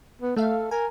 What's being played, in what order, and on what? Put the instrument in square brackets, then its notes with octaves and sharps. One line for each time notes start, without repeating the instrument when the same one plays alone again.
[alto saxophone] B3
[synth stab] A3 E5 F5 [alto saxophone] A4
[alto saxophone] A#4 [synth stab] G#5